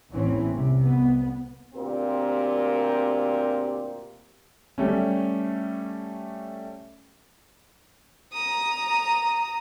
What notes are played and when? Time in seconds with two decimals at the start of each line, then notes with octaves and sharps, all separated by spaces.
0.12 A1 E2 E3 C4 C#4
0.49 C2 C3
0.81 C2 B3
1.74 D2 A#2 C4 G4 A#4
4.78 G3 A3 C#4
8.33 A#5 D#6